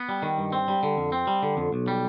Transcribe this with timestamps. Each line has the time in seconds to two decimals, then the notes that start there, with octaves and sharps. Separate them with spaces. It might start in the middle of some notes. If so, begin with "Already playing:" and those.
Already playing: B3
0.09 G3
0.23 D#3
0.38 G2
0.52 C4
0.68 G3
0.83 D3
0.97 F2
1.12 C4
1.27 G3
1.43 D3
1.57 F2
1.73 B1
1.88 G3